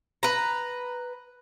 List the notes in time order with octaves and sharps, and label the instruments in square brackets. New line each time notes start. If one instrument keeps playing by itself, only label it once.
[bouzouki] B4 A#5